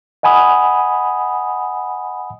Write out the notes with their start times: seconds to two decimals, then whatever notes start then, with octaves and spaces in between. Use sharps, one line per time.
0.23 D#5 F#5 G#5 B5 D#6